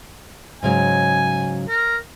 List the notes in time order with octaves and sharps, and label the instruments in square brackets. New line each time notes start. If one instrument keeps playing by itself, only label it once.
[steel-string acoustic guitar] G#2 C#3 F#3 [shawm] G#5
[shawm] A#4